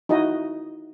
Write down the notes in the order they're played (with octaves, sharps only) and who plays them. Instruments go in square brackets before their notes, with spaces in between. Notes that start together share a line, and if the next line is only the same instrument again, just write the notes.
[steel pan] D#4 E4 F#4 D#5